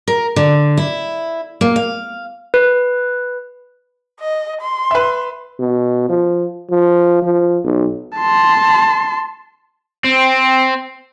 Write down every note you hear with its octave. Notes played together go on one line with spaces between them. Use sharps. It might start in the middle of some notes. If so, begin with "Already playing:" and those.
A#4
D3
E4
A#3
F5
B4
D#5
C6
B4 E5
B2
F3
F3
F3
B1
A5 C6
C4